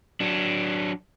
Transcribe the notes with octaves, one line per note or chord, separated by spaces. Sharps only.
F#3 D4